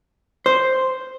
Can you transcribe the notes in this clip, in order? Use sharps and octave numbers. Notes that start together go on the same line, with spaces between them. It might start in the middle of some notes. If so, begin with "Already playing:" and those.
C5